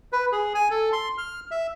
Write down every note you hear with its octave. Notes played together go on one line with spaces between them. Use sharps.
B4
G#4
G#5
A4
C6
F6
E5